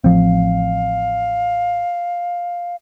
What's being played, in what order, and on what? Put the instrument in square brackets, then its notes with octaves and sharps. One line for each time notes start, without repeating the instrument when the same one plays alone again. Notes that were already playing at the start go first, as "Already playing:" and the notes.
[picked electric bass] A1 F3 C4 [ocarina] F5